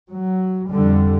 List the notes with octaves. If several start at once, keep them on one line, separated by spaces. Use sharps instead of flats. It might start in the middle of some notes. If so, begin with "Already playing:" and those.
F#3
F2 D3 G3